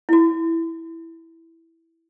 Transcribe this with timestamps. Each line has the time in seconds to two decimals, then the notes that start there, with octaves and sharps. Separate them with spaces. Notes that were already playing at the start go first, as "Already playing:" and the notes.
0.09 E4 F#4